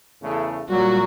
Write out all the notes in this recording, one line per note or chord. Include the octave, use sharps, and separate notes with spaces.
E2 C#3 A3
A#2 F#3 G3 F#4